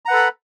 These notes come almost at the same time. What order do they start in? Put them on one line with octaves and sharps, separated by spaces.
A#5 F#5 B4 A4 B5